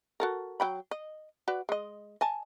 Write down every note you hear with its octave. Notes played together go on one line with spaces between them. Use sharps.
F#4 A4 A#4
F#3 G5 B5
D#5
F#4 B4 D5
G#3 D#5
D#5 G#5 A5